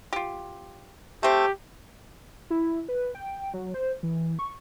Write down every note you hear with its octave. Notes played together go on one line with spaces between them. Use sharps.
F4 G4
A3 C4 G4
E4
B4
G5
F#3
C5
E3
C#6